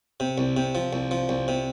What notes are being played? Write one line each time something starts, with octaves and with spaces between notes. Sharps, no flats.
C3
C2
C3
F3
C2
F3
C2
C3